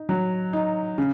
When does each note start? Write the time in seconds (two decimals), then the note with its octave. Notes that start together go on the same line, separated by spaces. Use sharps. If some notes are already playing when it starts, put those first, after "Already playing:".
Already playing: D#4
0.09 F#3
0.53 D#4
0.98 C#3